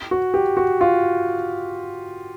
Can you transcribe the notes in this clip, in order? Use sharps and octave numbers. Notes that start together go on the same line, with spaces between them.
F#4
G4
F#4
F4